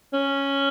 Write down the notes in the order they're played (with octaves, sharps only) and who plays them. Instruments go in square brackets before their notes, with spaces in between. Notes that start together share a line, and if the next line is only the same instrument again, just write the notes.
[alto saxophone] C#4